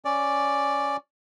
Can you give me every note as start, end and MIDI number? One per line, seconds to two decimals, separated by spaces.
0.05 0.96 61
0.05 0.96 74